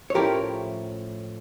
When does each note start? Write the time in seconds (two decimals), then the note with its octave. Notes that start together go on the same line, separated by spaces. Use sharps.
0.10 C#5
0.14 A2 F3 A3 C#4 E4 G4 A#4